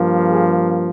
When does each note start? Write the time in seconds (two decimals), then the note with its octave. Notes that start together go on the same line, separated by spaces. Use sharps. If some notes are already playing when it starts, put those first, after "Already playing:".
Already playing: G2 F3 A#3
0.31 G#4